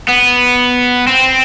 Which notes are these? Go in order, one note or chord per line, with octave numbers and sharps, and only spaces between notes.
B3
C4